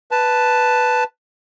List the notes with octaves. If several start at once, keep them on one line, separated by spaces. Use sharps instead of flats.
B4 A5